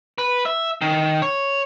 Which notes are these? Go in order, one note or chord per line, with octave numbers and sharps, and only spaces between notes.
B4
E5
D#3
C#5